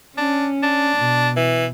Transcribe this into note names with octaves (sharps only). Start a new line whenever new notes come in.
C#4 D4
D4
B2
E3